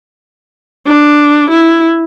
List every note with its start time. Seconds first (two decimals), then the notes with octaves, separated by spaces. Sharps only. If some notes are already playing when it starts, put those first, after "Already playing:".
0.87 D4
1.50 E4